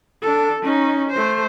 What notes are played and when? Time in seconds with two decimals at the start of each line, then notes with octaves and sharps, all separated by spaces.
0.22 D4 A4
0.62 C#4 D#4
1.11 A3 C5